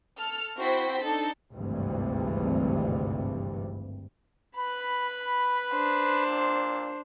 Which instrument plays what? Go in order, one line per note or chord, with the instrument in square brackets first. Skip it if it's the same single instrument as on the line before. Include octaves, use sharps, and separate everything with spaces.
[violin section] A4 F6
C4 E4 F#4 C5 G5 B6
D4 D#4 A4
[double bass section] G#1 D2 G2 C3 E3
[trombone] B4 [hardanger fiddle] B5
[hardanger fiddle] D4 C5
[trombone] A#2